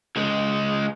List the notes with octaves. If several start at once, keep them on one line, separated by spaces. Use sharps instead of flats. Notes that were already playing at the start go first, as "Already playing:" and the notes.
C#2 G#3